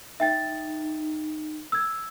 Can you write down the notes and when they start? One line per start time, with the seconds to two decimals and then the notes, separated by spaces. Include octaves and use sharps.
0.20 D#4 E5 G5 A6
1.72 E6 G#6